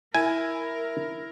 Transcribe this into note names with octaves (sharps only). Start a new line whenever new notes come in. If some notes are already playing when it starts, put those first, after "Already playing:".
E4 A#4 G#5